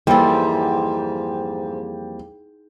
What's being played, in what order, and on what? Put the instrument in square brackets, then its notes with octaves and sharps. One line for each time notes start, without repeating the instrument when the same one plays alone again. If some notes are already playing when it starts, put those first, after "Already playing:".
[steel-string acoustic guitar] F2 G3 A#3 [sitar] G#2 [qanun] E3 A4 [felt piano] G5